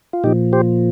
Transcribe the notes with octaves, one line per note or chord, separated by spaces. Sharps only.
F4
A#2 F3 D#4 G4
G4 C5